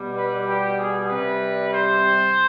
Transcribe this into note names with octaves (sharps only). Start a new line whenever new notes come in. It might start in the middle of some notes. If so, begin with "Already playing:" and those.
Already playing: B2 G3
B4
G4
G#4
C3 G3 B4
C5